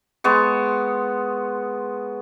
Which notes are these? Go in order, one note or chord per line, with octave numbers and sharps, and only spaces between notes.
G#3 B3 C#6